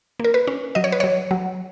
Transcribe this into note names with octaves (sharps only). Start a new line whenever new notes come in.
A#3 A#4
B4
C#4
F#3 D#5
C#5
B4
F#3 C#5
F#3